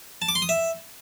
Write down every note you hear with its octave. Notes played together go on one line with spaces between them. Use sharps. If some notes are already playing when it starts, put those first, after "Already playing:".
A5
D6
C6
D#6
E5